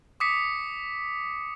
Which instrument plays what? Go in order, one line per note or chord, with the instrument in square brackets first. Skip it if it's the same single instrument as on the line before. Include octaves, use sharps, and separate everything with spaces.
[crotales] D6 D#6 B6 C#7